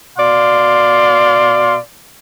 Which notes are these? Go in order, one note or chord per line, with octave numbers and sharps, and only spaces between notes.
B2 D5 F5 C6